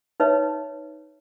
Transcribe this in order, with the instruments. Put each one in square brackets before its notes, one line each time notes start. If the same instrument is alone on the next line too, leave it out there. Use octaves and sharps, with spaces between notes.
[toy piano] D#4 B4 C#5 E5